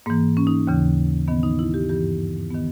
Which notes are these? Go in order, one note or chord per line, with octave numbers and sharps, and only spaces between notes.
G#2 E3 A#3
C#4
D#4
D#2 C#3 E3
G#2 D#3 B3
D#4
E4
G4
G2 E3 G4
D#3 B3